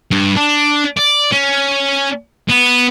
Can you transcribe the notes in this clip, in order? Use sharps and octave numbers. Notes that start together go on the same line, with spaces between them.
G2
D4
D5
C#4
B3